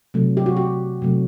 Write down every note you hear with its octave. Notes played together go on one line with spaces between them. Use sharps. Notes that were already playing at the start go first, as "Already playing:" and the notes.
C3 F#3 A3
G4
F#4
G4
C3 F#3 A3